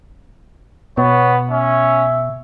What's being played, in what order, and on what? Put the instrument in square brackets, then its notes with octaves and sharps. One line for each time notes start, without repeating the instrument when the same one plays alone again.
[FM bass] B2 [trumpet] B3 [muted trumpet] C#5
[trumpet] C#4 [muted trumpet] E5